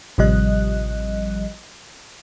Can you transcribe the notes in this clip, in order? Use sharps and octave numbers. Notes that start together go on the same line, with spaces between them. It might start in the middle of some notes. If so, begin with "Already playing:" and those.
A1 C3 F3 G3 D#5 F#6